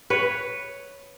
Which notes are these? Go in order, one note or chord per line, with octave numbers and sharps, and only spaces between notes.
B4 C#5